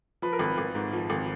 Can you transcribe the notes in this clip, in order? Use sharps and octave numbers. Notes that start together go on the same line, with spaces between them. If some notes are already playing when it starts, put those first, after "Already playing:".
F3 B4
A#4
G#1 B4
G#1
G#2
F3
G#1